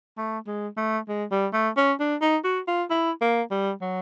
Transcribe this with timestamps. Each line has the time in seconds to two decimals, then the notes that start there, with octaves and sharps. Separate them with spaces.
0.17 A3
0.47 G#3
0.77 A3
1.08 G#3
1.31 G3
1.53 A3
1.76 C#4
1.99 D4
2.21 D#4
2.44 F#4
2.67 F4
2.90 E4
3.21 A#3
3.50 G3
3.81 F#3